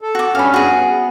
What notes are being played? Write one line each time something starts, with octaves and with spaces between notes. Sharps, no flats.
A4
F#4 D6
G2 C#4 F5 B5
F#4 G#4
B3